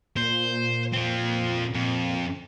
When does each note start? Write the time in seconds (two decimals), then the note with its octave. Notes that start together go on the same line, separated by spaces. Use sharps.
0.17 A#2 C5
0.93 F3 C4
1.74 F2